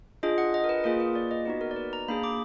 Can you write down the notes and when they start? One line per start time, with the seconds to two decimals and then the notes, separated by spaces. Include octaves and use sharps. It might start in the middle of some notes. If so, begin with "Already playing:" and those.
0.23 D4 F4 G#4 D#5
0.38 F#5
0.54 D#5
0.64 A#4
0.69 B4
0.84 A#3 F4 G#4 A#4
1.00 B4
1.15 D5
1.31 D#5
1.46 B3 D#4 F#4 B4
1.61 A#4
1.71 D5
1.76 B4
1.93 A#5
2.08 A#3 D4 G#4 B5
2.23 D6